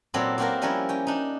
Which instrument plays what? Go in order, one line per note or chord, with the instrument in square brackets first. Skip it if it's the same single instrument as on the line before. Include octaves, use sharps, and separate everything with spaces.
[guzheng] A#2 F#3 C4 E4 A4 D5
A#3 C4 F#4 G4 A4 A#4
F3 G3 C#4 E4 A#4 C#5
C#4 G5
D4 D#4